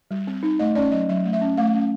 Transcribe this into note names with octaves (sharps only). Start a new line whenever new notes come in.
G3
C4
D#4
A3 D#5
C#4 D5
F#3 D#5
F#3 E5
A3
E5
C#4
A3 F5
C#4